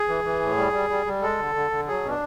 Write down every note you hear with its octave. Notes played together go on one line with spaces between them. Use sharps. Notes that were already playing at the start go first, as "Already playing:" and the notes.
Already playing: G#4
E3
E3
A2
G3
G3
G3
G3
G#3 A4
D3
D3
D3
F#3 G#4
B2 C#4
D4